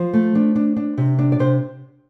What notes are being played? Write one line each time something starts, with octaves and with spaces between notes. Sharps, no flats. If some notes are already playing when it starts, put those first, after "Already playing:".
Already playing: F3 C5
A3
D4
D4
D4
C3
D4
D5
C3 C5